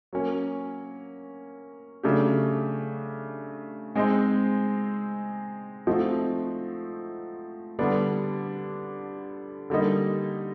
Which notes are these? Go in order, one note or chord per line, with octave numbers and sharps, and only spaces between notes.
F#3 A#3 C#4
C#3 F#3 A3 D4 G4
G#3 C4 D#4 G#4 C5
F3 A3 C4 D#4 F#4
D3 G3 B3 D4
D3 G3 A#3 D#4